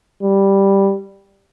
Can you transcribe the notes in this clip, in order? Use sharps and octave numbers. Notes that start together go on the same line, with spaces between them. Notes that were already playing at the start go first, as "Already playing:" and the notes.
G3